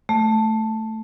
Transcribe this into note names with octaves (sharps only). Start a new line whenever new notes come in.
A3